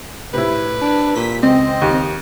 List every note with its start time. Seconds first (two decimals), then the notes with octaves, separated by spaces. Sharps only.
0.34 A2 C3 E4 B4
0.81 D4
1.16 A#2 B6
1.43 C#2 C4 D#5
1.82 D#2 G4